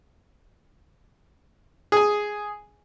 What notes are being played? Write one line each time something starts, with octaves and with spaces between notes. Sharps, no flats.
G#4 G#5